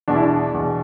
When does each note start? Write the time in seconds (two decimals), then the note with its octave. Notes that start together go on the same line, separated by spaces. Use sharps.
0.08 E2 B2 D4
0.15 E4
0.23 D4
0.54 E2 B2